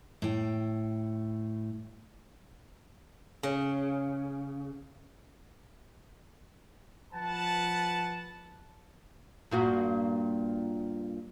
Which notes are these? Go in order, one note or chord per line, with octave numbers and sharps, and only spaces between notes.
A2 G5
C#3
F3 B4 F#5 A5
G2 A#2 F#4